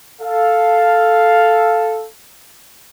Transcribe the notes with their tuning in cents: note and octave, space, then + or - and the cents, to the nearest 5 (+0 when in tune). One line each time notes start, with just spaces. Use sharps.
A4 +0 F5 +0